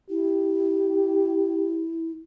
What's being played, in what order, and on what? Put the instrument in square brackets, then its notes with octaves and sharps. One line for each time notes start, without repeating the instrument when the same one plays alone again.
[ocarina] E4 [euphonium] G4